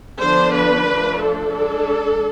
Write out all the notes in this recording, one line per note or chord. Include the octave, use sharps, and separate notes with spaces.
D3 F3 B3 D4 C5
B4
F3 A3 D4
A4
G#3 D4